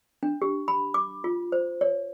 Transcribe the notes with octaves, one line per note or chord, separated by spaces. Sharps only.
D4
G4
B5
D6
F4
C5
C#5